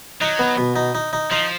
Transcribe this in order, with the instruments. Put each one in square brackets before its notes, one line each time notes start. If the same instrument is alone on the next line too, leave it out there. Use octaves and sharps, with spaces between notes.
[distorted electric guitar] F#3 [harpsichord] D#4
[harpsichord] B3
B2
D#4
D#4
D#4
[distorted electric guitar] F3 [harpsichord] D#4